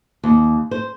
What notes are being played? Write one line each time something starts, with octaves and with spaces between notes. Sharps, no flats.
D#2
C5